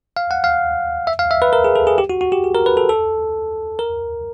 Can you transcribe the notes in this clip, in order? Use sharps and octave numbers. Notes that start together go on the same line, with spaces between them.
F5
F#5
F5
E5
F5
E5
B4
A#4
G#4
A4
G#4
G4
F#4
F#4
G4
G#4
A#4
B4
A4
A4
A#4